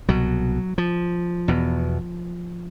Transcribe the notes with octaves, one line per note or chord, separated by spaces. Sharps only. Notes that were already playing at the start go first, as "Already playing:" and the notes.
C2 B2 F#3
F3
E2 B2